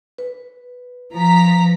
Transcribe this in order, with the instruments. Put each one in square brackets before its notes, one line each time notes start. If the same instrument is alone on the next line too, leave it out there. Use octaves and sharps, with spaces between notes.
[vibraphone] B4
[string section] F3 A#5 B6